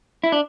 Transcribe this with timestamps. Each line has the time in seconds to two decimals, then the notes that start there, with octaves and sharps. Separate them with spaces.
0.24 E4
0.32 D4